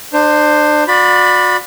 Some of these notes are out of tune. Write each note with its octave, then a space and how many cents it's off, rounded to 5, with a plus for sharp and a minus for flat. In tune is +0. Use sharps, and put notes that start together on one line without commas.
D4 +30 C5 +0
F#4 -35 D5 +10 B5 +0